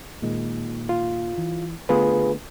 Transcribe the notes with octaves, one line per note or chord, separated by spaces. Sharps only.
A#2 D#3 G#3
F4
E3
D3 A3 B3 F4 G#4 B4